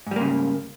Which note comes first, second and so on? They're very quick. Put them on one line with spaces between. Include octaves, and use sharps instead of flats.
G#2 G3 A#3 C#3